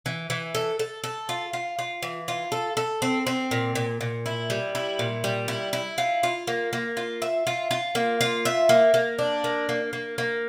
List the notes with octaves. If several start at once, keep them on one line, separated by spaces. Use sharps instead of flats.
E3
E3
A4
A4
A4
F4
F4
F4
E3
F4
A4
A4
C4
C4
A#2
A#2
A#2
E4
G3
E4
A#2
G3
E4
E4
F4
F4
A#3
A#3
F4
E5
F4
F4
A#3
F4
E5
A#3
A#3
D4
A#3
A#3
A#3
A#3